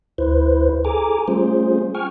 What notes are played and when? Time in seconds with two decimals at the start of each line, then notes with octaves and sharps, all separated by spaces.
0.18 D2 E4 B4 C5
0.85 G#4 A4 G#5 A#5 D6
1.28 G3 A3 C#4 F4 G#4 C5
1.95 G5 G#5 C#6 F6